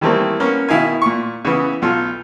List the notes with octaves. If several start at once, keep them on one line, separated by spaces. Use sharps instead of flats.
D#3 E3 G3 A3 A#3 C4
A#3 B3 C#4
B2 D#3 E4 F5 G#5
A#2 C#6
C#3 E3 B3
B1 F4 A4